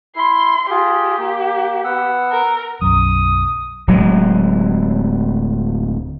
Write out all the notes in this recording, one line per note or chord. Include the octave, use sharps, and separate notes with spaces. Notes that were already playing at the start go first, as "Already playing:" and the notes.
E4 C6
F4 G4 G#4
A#3
B3 F#5 E6
A#4
B1 F#2 D#6
D1 F#3 G#3